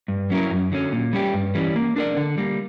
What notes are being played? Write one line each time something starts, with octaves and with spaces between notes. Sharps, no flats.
G2
F#3 C#4 E4 A#4
F#2
D3 F#3 C#4
A#2
G3 C#4 G4
G2
E3 G3 C#4
A#3
D4 A#4 D5
D3
G3 A#3